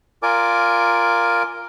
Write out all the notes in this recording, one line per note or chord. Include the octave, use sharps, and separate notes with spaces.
F4 A#4 D5 G#5 D6